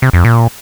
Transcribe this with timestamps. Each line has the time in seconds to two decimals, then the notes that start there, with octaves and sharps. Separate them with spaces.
0.02 C3
0.13 F2
0.25 A#2